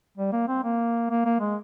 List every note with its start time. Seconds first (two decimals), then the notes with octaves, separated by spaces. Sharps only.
0.18 G3
0.33 A#3
0.48 C4
0.63 A#3
1.10 A#3
1.25 A#3
1.40 G#3